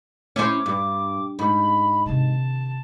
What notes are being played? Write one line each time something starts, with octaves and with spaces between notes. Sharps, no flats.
C#4 E4 C5 D6
G2
G#2 B5
C3 D#3 A5